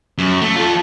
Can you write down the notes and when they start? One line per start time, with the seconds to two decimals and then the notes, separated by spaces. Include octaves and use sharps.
0.18 F#2
0.42 A3
0.56 F4 A4